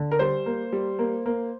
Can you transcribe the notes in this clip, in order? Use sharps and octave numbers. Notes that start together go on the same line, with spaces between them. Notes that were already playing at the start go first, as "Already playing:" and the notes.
Already playing: D3
A#4
G3 C5
A#3
G3
A#3
A#3